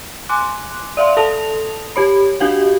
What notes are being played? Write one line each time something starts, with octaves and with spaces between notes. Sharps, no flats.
G#5 C6 D6 F#6
D5 E5 F5 C6
A4 A5 D#6 F7
G4 C#5 B5
D4 F#4 G4 F5 F#5